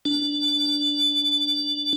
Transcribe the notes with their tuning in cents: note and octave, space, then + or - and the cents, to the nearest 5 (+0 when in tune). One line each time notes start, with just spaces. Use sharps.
D4 -10